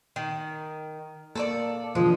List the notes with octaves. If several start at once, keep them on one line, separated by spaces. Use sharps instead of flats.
D#3
A#3 A4 C5 D5
B2 D3 E3 F3 G#3